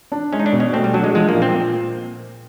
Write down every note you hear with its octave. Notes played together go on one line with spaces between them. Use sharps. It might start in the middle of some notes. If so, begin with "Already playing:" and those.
D4
G#3 C#4
D#4
D4
B2
C#4
A3 C4
G3
F#3 D4
G#3
F3 G#3
A#3
A#2
C4